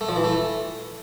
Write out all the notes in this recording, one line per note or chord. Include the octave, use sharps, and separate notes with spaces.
A3
F3
E3
A3